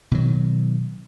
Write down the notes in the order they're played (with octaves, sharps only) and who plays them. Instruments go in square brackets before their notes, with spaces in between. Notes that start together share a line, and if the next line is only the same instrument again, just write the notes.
[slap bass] B2 D#3 F#3